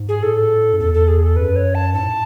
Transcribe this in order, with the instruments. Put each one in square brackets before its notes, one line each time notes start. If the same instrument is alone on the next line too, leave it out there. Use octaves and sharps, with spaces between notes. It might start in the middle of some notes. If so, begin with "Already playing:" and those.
Already playing: [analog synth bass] G#2
[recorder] G#4
[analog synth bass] A2 [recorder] A4
[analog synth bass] F#2
[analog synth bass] E2 [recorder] A4
[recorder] A4
G#4
A4
[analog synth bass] F#2 [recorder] B4
[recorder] C#5
A5
[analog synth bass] G#2 [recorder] A5
[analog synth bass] A2